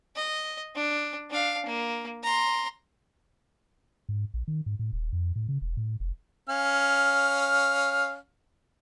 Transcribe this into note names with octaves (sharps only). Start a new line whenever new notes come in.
D#5
D4
D4 F5
A#3
A#5 C6
G#2
A#1
D#3
G#2
A2
D#1
F2
A2
C#3
E1
A2
F1
C#4 F5 F6